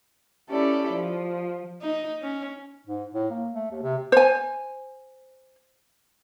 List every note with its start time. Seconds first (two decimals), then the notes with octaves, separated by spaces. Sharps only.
0.50 C#4 E4 G4 A4 D5
0.92 F3
1.82 D#4
2.22 C#4
2.87 G#2
3.14 A2
3.30 A#3
3.53 A3
3.71 D#2
3.83 C3
4.12 C5 G#5